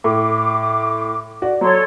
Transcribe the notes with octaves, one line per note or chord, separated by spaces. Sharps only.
A2 D6
F#4 D5
F#3 A4 C#5 C6